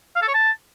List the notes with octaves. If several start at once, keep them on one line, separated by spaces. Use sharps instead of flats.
F5
A4
C#5
A5